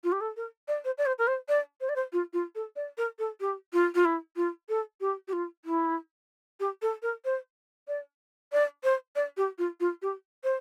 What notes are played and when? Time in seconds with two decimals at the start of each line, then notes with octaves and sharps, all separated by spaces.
0.04 F4
0.12 G4
0.21 A4
0.36 A#4
0.68 D5
0.84 C5
0.98 D5
1.06 C5
1.18 A#4
1.27 C5
1.48 D5
1.81 C5
1.89 D5
1.96 C5
2.13 F4
2.33 F4
2.55 A4
2.76 D5
2.97 A#4
3.19 A4
3.40 G4
3.73 F4
3.95 F4
4.05 E4
4.36 F4
4.69 A4
5.01 G4
5.28 G4
5.33 F4
5.65 E4
6.60 G4
6.82 A4
7.02 A#4
7.25 C5
7.88 D5
8.52 D5
8.84 C5
9.15 D5
9.37 G4
9.58 F4
9.80 F4
10.02 G4
10.44 C5